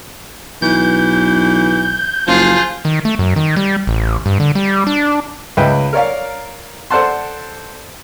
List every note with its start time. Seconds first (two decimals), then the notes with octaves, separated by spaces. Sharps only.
0.62 B1 E3 G6
2.27 F#1 F3 F4 G#4
2.85 D#3
3.05 A3
3.19 F#2
3.36 D#3
3.56 G3
3.87 A1
4.26 G2
4.40 D3
4.55 G3
4.87 D4
5.57 C#2 B4 D#5 E5 G5
5.93 A#4 C#5 D5 F5
6.90 A4 C5 D5 F#5 A5 C6